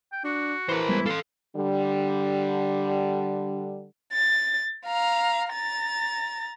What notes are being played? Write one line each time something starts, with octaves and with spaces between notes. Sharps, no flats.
G5
D4 F#4
E3 A#4 C5
G3 G#3 B3 E4
A4 F5 C6
D3 G3
A6
F5 A#5
A#5 A6